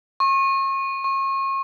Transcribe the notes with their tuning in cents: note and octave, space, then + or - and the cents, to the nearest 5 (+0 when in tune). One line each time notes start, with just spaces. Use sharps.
C#6 -35
C#6 -35